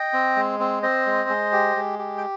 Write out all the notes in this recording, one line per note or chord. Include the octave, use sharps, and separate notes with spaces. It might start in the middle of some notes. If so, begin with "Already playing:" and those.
Already playing: D#5 G5
C4
G#3
C4
C4 C5 D#5
G#3
G#3
G4
G#3
G4
G5